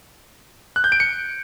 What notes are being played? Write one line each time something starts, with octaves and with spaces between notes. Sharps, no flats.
F#6
G6
D7
C#7